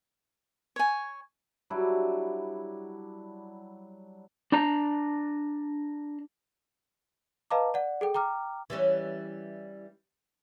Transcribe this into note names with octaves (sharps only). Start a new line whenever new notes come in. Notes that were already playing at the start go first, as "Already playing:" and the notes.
C#5 G#5
F#3 G3 D4 E4
D4 A5 A#5
B4 D#5 F5 A5 A#5 D6
D5 F#5
G#4 A4 G5
G5 A#5 D6 F6
E3 G3 C#4